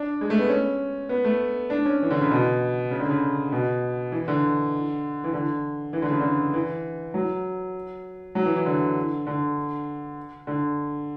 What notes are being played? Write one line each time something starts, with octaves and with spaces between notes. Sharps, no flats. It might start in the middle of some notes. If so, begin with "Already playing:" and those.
Already playing: D4
G#3
A3
B3
C#4
B3
A3
D4
C#4
E3
D3
C#3
B2
C#3
D3
C#3
B2
E3
D3
E3
D3
E3
D3
C#3
D3
E3
F#3
F#3
E3
E3
D3
D3
D3